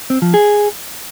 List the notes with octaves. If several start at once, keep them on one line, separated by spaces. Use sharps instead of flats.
C4
F3
G#4